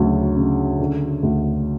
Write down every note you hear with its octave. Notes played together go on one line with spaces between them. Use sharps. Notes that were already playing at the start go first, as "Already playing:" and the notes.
Already playing: D2 C#3 F#3
C#3
D3
D2